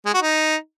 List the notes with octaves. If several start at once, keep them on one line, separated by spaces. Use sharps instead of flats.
G#3
F#4
D#4